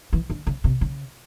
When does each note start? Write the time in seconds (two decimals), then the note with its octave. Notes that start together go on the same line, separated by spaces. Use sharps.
0.13 E3
0.30 D3
0.47 C#3
0.64 C3
0.81 C#3